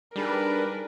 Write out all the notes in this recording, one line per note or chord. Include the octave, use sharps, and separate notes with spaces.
G3 D4 D#4 G#4 A#4 B4 G#5